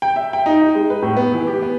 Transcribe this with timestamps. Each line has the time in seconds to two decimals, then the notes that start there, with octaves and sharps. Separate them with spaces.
0.02 G5
0.16 E5
0.33 G5
0.46 D#4
0.61 D#4
0.75 G#3
0.90 B4
1.02 A2
1.17 B3
1.33 E3
1.47 G4
1.62 B3